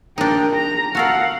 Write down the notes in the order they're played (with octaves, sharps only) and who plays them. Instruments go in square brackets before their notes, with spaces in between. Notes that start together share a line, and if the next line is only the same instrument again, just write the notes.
[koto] D4 D#4 [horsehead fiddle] A#4 G5
[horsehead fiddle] A#5
[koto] F#4 A4 A#4 [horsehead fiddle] F5 F#5